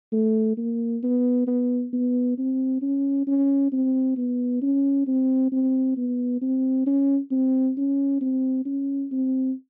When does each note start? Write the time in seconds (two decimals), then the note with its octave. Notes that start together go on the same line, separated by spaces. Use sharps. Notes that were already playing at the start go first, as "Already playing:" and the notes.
0.12 A3
0.57 A#3
1.03 B3
1.47 B3
1.93 B3
2.38 C4
2.82 C#4
3.27 C#4
3.72 C4
4.17 B3
4.62 C#4
5.07 C4
5.52 C4
5.97 B3
6.41 C4
6.86 C#4
7.31 C4
7.77 C#4
8.21 C4
8.66 C#4
9.11 C4